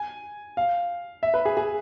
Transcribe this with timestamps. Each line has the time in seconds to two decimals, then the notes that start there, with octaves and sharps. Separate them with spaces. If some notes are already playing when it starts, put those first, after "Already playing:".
Already playing: G#5
0.57 F5
1.23 E5
1.34 B4
1.45 G#4
1.57 G#4